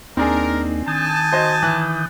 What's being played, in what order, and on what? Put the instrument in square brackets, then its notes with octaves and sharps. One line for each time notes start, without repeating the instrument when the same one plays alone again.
[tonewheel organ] D#2 A#3 D#4 [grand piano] C4 D4 G#4 [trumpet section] A#4
[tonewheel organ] D#3 D#6 G6 [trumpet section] G#5 A5
[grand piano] F#4 C5 D#5
E3 F#6 A6